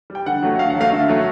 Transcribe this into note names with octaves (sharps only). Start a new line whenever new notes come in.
G3
G5
D3 F#5
F#3 A3
D3 F5
F#5
F#3
A3 F5
D3 E5
F#3 A3